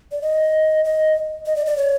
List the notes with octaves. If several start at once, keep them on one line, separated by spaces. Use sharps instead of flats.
D5
D#5
D#5
D#5
D5
D5
C#5